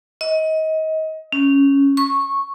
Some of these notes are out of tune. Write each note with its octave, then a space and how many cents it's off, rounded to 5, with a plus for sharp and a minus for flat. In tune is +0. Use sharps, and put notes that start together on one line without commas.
D#5 +25
C#4 +0
C#6 -15